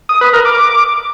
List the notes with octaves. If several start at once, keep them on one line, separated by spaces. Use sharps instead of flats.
D#6
B4
A#4
D6